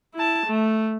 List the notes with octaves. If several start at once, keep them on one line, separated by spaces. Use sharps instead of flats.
E4 A5
A3